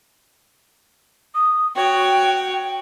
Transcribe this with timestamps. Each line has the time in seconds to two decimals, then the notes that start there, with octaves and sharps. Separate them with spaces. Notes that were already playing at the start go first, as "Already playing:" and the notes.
1.35 D#6
1.76 F#4 C#5 G5